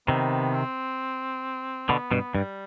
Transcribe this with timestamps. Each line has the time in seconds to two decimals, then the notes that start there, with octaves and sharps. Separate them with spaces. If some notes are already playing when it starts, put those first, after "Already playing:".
0.08 C3 D#3 B3
0.54 C4
1.89 B2 D3 B3
2.11 G2 B2
2.34 G2 G3